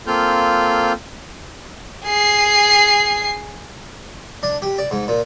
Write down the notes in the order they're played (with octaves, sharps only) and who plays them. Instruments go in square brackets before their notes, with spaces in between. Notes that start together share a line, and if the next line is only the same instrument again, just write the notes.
[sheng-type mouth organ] A#3 C4 F4 A4 F6 G6
[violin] G#4 C7
[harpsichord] D4
G4
D5
G#2
A#2